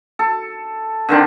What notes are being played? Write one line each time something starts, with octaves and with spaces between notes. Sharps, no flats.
A4
D3 D#3 C4 D4